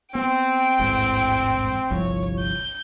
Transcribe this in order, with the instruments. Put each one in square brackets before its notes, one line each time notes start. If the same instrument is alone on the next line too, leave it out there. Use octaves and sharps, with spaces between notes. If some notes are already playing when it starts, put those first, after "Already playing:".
[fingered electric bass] B3 [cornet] C4 [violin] G5 D7
[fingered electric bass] E1 A1 G#2
[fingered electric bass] G1 C2 F3 [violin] C#5
[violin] G6